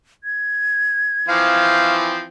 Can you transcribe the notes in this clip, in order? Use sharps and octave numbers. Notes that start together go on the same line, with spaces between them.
G#6
E3 F3 C4 F5